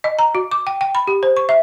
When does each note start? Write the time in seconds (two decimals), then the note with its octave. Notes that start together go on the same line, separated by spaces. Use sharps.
0.04 D#5
0.19 A#5
0.35 F#4
0.52 D6
0.67 G5
0.81 G5
0.95 B5
1.07 G4
1.23 C5
1.37 C#6
1.49 E5